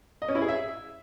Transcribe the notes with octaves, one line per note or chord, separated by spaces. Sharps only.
D#5
C#4
E4
G#4
E5